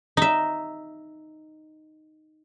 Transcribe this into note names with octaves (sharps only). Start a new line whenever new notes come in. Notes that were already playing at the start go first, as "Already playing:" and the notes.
D#4 E5